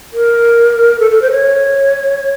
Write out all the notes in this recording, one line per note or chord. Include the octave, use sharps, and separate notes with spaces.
A#4
A4
A4
C5
C#5